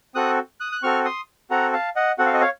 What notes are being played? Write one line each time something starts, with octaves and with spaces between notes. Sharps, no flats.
C4 F#4 A4 D#6 F#6
D#6 F#6
F#6
C4 F#4 A4 C#6 F6
C6 D#6
C4 F#4 A4 F#5 A#5
F5 A5
D#5 F#5
C4 F#4 A4 F#5
F5
D#5
C#5 F5